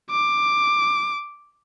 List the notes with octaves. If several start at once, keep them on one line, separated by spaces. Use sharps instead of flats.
D6